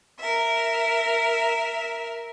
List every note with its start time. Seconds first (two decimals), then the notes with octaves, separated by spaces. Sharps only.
0.20 A#4 E5